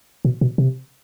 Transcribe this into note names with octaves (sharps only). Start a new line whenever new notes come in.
B2
B2
C3